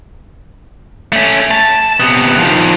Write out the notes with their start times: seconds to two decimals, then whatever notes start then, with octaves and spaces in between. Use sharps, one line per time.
1.12 A3 C#4
1.51 A5
2.00 C3 B3
2.38 D#3 F3